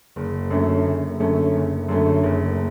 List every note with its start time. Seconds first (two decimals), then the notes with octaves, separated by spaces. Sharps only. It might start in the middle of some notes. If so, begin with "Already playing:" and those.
0.16 F#1
0.51 F#2 D3 A3 C#4
0.85 F#1
1.20 F#2 D3 A3 C#4
1.54 F#1
1.89 F#2 D3 A3 C#4
2.23 F#1